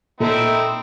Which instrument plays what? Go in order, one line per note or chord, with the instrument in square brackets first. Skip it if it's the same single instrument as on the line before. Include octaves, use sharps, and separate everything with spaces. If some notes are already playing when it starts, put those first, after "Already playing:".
[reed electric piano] A#2 [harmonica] C4 D#4 E4 [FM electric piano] A4